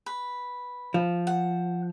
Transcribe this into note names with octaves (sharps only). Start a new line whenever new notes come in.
B4
F3
F#5